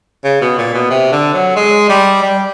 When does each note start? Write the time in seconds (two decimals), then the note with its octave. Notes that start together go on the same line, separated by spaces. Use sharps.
0.24 C#3
0.41 B2
0.58 A#2
0.74 B2
0.90 C3
1.12 D3
1.33 F#3
1.56 G#3
1.89 G3
2.22 G3